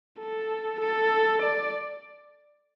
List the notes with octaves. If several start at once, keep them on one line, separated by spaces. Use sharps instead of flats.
A4
A4
D5